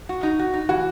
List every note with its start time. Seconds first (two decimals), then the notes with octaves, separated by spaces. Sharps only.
0.09 F#4
0.23 D#4
0.39 F#4
0.54 D#4
0.69 E3 F#4